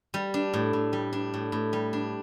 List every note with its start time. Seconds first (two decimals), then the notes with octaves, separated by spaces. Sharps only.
0.14 G3
0.34 D4
0.53 A2
0.73 A2
0.93 G3
1.13 D4
1.34 A2
1.52 A2
1.73 G3
1.93 D4